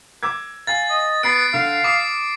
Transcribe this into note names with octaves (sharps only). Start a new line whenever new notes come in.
D6 E6 G#6
F5 G#5 A6
D#5
B3 B5 F#6 C7 D7
D3 F5
D6 D#6 C7